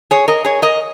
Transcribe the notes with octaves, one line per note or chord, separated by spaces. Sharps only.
G#4 C#5
A#4 D#5
G#4 C#5
A#4 D#5